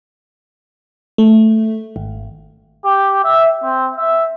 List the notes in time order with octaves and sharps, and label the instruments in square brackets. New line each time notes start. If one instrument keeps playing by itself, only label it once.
[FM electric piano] A3
G#1
[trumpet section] G4
E5
C4
E5